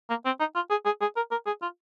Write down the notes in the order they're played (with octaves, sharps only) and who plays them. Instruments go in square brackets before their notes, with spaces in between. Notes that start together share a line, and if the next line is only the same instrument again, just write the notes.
[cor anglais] A#3
C4
D#4
F4
G#4
G#4
G#4
A#4
A#4
G#4
F4